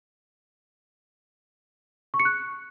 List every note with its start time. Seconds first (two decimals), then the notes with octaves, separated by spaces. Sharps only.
2.14 C#6
2.20 C#7
2.25 F#6